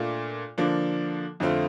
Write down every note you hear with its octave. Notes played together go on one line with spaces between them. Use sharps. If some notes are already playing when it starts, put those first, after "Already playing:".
Already playing: A#2 A3 D4 F4
D3 F3 A#3 D4
F2 D3 A3 C4 F4